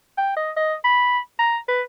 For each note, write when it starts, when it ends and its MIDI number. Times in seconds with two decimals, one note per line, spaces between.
0.17 0.32 79
0.37 0.51 75
0.56 0.74 75
0.84 1.18 83
1.39 1.57 82
1.68 1.82 71